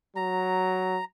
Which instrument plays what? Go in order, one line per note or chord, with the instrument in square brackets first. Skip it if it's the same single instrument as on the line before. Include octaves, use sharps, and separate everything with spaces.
[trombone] F#3 [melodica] A#5